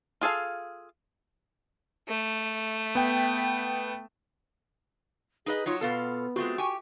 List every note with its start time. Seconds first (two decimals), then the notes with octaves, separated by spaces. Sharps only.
0.21 F4 G#4 A4 F5
2.08 A3
2.95 B3 G5
5.46 D#4 G#4 B4 D#5
5.66 F#3 D#4 F4 C#5
5.81 B2 B3 F4 A4
6.36 G#3 A3 C4 F4 F#4
6.58 G4 G#5 C#6